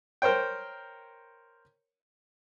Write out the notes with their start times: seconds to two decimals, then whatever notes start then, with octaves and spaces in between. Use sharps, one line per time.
0.22 A#4 C5 C#5 G5